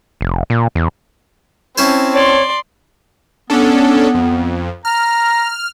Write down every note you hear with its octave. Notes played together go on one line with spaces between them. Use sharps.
F1
A#2
E2
C4 C#4 E4 C5 A5
C#5 D5 C6
B3 C#4 D4 A4
F2
A#5 F6